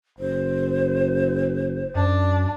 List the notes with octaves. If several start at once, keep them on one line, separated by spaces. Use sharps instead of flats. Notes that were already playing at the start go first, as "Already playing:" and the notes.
F#1 C5
F#2 D4